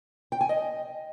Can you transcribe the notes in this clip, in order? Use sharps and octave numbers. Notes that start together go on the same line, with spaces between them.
G5
G#5
D#5